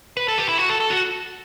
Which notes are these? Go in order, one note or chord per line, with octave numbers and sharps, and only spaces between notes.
B4
A4
G4
E4
F#4
A4
A4
F#4